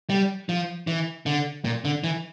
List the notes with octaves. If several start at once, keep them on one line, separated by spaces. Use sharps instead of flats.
G3
F3
E3
D3
A#2
D3
E3